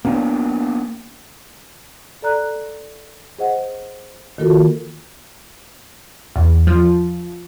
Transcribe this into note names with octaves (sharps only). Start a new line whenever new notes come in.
A#3 B3 C#4 D4
A4 D5 A#5 F#6
G#4 C5 D#5 F#5
D#3 A#3 F4 F#4 A4 A#4
E2
F3